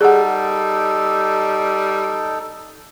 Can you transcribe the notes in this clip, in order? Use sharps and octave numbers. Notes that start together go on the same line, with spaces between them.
G3 D#4 G#4 A4 F#5